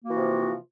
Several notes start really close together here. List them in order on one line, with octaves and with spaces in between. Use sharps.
A#3 F#4 E3 C3 F3